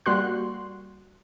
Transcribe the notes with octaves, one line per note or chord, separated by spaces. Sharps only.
G3 A#3 F#4 C6 F#6